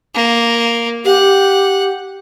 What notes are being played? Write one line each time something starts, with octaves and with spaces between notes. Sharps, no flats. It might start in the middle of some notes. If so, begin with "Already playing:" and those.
A#3
G4 F#5